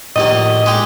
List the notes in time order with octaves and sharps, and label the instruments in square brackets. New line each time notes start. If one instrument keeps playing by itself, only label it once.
[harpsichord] A#1 D#2 A#3 [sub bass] A2 [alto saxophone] D#5
[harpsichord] G#3 G4